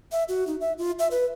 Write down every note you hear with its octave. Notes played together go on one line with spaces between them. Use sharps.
E5
F#4
D#4
E5
F4
E5
B4